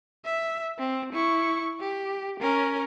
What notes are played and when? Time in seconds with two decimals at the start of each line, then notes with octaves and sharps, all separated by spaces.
0.25 E5
0.79 C4
1.13 E4 C#6
1.80 G4
2.40 C#4 A#4